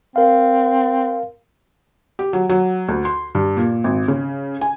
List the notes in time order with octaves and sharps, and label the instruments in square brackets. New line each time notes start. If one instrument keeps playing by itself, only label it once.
[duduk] C4 [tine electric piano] A#4 F5
[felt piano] G4
F#3
F#3
D2
C6
G2
A#2
G#1
C#3
G#5